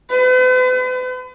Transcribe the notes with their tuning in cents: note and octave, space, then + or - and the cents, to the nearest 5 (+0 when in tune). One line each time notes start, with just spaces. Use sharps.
B4 +45